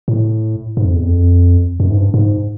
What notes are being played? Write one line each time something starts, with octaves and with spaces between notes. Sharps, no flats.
A2
G#2
F2
E2
F2
F#2
G#2
G2
G#2